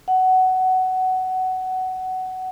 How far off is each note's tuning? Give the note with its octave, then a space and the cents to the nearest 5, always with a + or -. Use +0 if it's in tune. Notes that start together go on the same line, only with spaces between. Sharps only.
F#5 +15